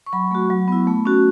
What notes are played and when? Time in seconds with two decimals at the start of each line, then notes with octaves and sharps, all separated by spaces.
0.06 C#6
0.13 F#3 B5
0.31 A3 F#4
0.50 F#3
0.68 B3 E4
0.87 A3
1.05 C#4 F#4